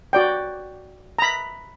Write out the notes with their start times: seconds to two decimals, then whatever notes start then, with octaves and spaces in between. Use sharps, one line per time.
0.13 F#4 D5 G5
1.19 A#5 B5